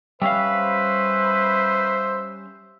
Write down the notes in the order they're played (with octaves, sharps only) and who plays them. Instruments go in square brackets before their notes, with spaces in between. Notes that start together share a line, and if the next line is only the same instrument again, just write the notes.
[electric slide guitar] G3 C#4 F5 [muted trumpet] B4 [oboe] E5
[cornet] C5